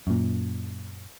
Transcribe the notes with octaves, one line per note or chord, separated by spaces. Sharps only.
F#2 A#2